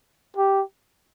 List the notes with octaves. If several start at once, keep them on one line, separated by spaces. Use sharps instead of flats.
G4